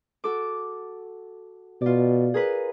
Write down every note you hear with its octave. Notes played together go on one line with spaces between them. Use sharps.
F#4 A4 D6
B2 F4 D5
G#4 A#4 B4